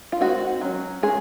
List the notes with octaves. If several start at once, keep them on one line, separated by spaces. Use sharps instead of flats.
F4
D#3 G#3 C4 D#4 F#4
F#3 C#4
G#3 C#4 G#4